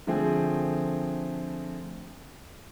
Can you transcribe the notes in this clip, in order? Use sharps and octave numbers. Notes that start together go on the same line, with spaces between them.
D3 F3 A3 C4 G#4